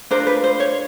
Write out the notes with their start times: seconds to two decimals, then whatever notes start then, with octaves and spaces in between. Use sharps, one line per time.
0.11 D4 F4 A#4 C5
0.27 B4
0.44 C5
0.60 C#5